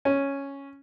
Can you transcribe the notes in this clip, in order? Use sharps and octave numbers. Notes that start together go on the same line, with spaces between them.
C#4